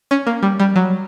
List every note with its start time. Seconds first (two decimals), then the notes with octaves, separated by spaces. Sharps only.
0.11 C#4
0.27 A#3
0.43 G3
0.60 G3
0.76 F#3